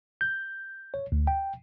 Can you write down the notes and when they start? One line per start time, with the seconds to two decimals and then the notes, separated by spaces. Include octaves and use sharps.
0.21 G6
0.94 C#5
1.12 D2
1.27 G5